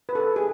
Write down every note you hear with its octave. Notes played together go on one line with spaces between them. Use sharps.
B4
A4
G#4